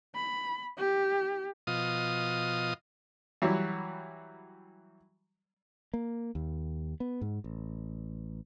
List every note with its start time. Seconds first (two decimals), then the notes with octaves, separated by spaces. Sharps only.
0.15 B5
0.78 G4
1.67 B2 F3 F4 D#5 D#6
3.42 E3 F#3 G3 F#4
5.94 A#3
6.35 D#2
7.00 B3
7.21 G#2
7.44 A1